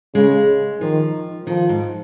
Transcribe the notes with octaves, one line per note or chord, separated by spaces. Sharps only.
C#3 G#3
D#3 F3
D#3 F3
G#2